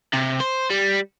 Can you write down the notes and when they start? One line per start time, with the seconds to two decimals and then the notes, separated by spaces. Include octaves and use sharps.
0.13 C3
0.40 C5
0.70 G3